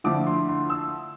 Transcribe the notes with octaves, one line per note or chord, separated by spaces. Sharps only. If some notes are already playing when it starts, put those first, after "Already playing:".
D3 F3 A3 E4 D6
C6
C6
E6